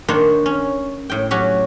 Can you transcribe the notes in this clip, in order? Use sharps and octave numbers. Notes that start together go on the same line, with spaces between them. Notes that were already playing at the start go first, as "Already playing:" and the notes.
D#3 A#3 D4 C5 C#5
C#4
A2 G5
F#3 C#4 F#4 G4